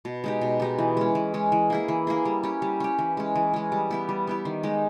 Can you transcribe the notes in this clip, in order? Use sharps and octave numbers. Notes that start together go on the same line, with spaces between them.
B2
G#3 D#4 G4
B2
G#3 D#4 G4
E3
G#3 C#4
E3
G#3 C#4
E3
A#3 E4 G#4
E3
A#3 E4 G#4
G3
C#4 G4
G3
C#4 G4
E3
G#3 C#4
E3
G#3 C#4
G3
B3 E4 G4
G3
B3 E4 G4
D#3
G#3 D#4 G4